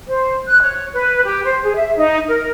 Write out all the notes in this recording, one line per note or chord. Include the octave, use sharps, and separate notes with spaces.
C5
F#6
C#5
B4
G4
C5
G#4
E5
D#4
A#4